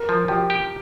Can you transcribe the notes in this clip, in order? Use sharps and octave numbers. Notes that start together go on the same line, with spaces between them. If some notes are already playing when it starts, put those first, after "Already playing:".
Already playing: A#4
F3
F3 G4
G4